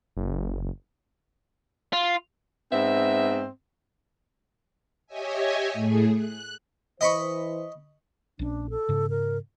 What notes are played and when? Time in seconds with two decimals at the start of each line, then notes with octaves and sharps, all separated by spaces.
0.17 F#1
1.93 F4
2.71 G#2 B3 C4 E5
5.07 G4 C#5 D#5 E5 G#5
5.73 A2 A3 G#4
6.15 F#6
7.01 E3 C5 D#5 B5 C#6
8.39 A#1 C#4 D4
8.70 A4
8.89 G#2 C#3
9.10 A#4